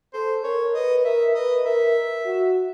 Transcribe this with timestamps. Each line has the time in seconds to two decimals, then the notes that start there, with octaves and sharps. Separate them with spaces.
0.14 A4 C5
0.44 A#4 C#5
0.74 B4 D#5
1.04 A#4 E5
1.34 B4 D#5
1.65 A#4 E5
2.25 F#4